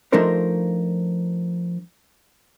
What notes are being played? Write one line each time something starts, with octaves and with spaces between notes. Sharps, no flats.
F3 A3 D4 D#4 A#4 C5